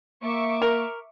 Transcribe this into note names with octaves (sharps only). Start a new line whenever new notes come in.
A#3 E5 C#6 D6
A#4